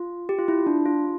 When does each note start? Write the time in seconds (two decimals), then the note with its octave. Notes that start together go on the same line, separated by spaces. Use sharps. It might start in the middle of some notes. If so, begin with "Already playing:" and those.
Already playing: F4
0.29 G4
0.38 F4
0.48 E4
0.67 D4
0.86 F4